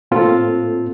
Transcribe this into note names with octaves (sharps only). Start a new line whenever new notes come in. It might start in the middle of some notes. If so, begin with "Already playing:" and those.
A2 A#3 C4 F4 A4